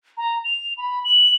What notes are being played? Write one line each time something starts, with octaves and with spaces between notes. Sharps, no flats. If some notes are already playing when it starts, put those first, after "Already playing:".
A#5
F7
B5
F#7